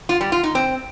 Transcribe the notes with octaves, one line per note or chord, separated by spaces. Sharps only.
F4
G3
F4
D#4
C4